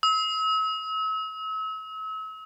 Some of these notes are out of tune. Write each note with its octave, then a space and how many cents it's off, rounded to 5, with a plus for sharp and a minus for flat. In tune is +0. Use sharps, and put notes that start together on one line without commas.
E6 -40